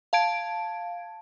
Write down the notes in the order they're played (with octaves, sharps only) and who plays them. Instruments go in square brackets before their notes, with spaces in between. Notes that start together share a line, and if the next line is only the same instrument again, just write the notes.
[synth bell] F5 A5 G#6 D7